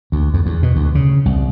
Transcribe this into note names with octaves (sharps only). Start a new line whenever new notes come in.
D2
F2
E2
B2
D2
C#3
C2